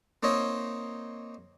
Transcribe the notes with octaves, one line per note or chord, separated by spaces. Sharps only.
A#3 C4 D#4 C#5 D#5 E5